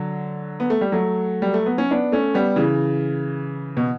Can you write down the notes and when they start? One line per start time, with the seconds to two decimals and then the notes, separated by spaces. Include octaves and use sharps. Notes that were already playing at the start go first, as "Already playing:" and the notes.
Already playing: D3 F#3
0.60 B3
0.70 A3
0.81 G3
0.92 F#3 A3
1.42 G3
1.54 A3
1.66 B3
1.78 C#4
1.91 B3 D4
2.12 A3 C#4
2.34 G3 B3
2.56 C#3 E3
3.77 B2